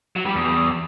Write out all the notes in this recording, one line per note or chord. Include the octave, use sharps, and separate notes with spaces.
F#3
G3
E2